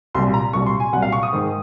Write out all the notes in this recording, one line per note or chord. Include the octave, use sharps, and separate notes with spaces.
C2 A#2 F#3 C6
A#5
C2 A#2 F#3 C#6
C6
G#5
C2 A#2 F#3 F#5
F5
C#6
D#6
G#2 D#3 G#3